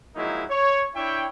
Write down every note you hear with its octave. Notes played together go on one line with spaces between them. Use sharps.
F3 F#3 G#3 A#3 D#4 E4
C#5
D4 E4 C#5 E5 G5